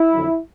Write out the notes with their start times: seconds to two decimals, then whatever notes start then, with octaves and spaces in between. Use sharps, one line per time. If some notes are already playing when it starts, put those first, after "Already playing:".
Already playing: E4
0.12 F2 D3 F#3